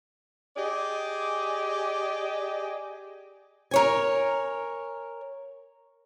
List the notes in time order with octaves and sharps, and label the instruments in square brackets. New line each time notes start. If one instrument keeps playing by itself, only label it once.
[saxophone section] G4 G#4 D5 D#5
[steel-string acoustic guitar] A#4 C#5 G#5